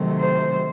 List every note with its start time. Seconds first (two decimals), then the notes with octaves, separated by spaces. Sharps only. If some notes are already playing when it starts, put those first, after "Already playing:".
Already playing: C3 D#3 F#3 A3 C4
0.19 C5